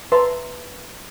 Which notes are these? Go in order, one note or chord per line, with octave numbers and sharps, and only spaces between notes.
B4 E5 A5 A#5 C6